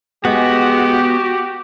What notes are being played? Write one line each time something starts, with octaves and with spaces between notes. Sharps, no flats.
G#3 B3 F#4 G4